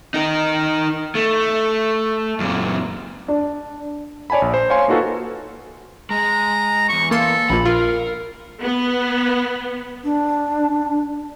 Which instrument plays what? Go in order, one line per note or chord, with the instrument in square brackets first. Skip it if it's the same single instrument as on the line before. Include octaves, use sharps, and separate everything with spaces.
[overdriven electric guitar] D#4 A#4
A3
F#2 A#2
[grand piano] D4
[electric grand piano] C#5 D5 G#5 A5 B5
A#1
C5
C#5 F5 G#5 C6
A#3 D#4 F4 F#4 A4 B4
[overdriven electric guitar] G#3 [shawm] A#5
[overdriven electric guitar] E2 G#2 [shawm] C#6
[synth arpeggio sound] A#3 C6 [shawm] A4
[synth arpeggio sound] A#1 A#2 [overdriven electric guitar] B5
[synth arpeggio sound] F4 [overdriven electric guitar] A#4 [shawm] F5
[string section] B3
[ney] D4